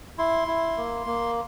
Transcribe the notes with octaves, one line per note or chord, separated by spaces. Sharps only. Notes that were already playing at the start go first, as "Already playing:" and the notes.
E4 C6
E4
A#3
A#3